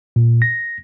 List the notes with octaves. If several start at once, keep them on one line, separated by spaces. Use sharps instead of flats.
A#2
A#6